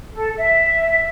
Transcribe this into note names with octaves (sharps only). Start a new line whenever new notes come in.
A4
E5